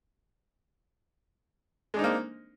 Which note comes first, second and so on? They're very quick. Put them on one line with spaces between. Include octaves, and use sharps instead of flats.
G#3 D4 D#4 C4 A#3